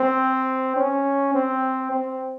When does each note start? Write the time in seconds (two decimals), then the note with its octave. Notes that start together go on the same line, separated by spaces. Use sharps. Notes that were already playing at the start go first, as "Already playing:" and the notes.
Already playing: C4
0.76 C#4
1.34 C4
1.91 C4